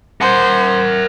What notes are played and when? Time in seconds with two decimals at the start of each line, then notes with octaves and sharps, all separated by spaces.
0.21 A#4 C5 F#5